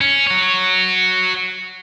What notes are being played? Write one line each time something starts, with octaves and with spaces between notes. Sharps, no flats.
C#4
F#4 C#5